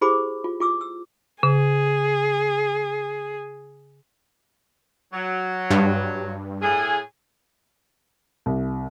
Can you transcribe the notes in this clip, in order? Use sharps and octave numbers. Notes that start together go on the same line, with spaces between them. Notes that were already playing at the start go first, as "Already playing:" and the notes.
E4 G4 G#4 C5 B5 D6
F4
F4 D6 E6
E6
C#3 G#4
F#3
G2
A2 G#4
C2